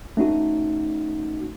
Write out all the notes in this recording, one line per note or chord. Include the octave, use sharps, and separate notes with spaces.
A3 C#4 D#4 F#4